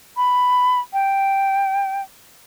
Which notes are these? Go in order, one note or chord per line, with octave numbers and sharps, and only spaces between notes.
B5
G5